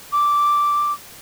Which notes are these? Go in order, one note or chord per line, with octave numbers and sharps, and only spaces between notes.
D6